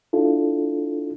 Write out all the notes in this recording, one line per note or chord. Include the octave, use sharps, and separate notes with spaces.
D4 E4 F4 A4